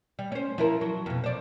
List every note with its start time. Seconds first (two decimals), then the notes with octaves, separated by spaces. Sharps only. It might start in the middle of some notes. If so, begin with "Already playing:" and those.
0.19 G3
0.32 C#4 C5
0.58 F3 E4 A#4
0.81 F#3
1.06 F2 B2
1.24 C5 D5